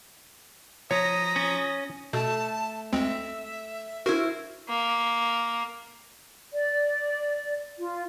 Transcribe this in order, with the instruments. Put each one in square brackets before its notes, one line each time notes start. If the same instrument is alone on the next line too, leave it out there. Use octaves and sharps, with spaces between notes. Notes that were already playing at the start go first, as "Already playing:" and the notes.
[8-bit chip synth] F3 A#5 B6 [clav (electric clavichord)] C#5 [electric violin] D#6 A#6
[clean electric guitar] C#4
[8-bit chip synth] B2 [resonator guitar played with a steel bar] A3 [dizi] A5
[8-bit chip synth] D2 G#3 C4 [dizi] E5
[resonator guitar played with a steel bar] E4 C5 [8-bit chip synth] F#4 A#4
[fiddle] A#3
[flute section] D5
F4